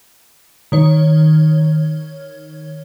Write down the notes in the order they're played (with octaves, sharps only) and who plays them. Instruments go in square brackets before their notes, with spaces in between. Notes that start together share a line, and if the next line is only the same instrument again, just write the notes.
[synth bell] D#3 C#5